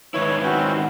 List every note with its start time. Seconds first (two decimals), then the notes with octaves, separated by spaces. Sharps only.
0.14 G#2 D#3 E4 B4 C#5
0.43 C4 C#4 F#4 C5